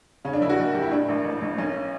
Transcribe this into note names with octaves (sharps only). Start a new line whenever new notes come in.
C#3 C#4
D4
F#1 E4
F#4
F#1
F#1 G4
E4
A2 D4
A1
A1
A1
B1 C#4